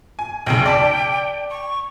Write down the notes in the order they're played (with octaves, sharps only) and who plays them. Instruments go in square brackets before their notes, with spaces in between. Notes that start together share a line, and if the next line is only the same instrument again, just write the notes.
[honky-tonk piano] G#5
[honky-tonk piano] B1 F#2 C#3 [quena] G5
[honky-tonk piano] D5 A5 B6
[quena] C#6